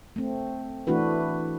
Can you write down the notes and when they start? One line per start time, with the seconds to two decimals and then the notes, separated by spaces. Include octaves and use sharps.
0.16 A3 C4
0.87 E3 A3 D4 E4 F#4 B4